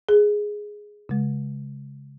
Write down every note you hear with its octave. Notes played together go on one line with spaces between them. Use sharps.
G#4
C#3 G#3